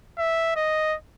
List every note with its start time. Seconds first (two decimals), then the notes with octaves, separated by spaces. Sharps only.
0.19 E5
0.56 D#5